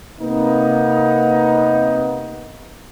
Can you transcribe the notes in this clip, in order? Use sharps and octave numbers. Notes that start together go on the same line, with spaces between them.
C3 A#3 B3 D#4